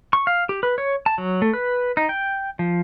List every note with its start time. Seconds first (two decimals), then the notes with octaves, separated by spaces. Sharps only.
0.13 C#6
0.27 F5
0.49 G4
0.63 B4
0.78 C#5
1.06 A5
1.18 F#3
1.42 A3
1.53 B4
1.97 D#4
2.09 G5
2.59 F3